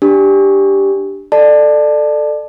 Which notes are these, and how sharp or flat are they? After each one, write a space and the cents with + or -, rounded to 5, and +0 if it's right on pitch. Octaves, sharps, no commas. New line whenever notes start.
D4 -5 G4 +0
A4 +0 D5 +25 A5 +0